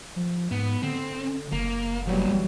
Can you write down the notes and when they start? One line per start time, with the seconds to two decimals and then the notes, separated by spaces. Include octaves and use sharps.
0.16 F3
0.51 G#2 B3
0.83 D3 C4
1.52 F#1 A#3
2.07 E2 A#2 E3 F#3 G3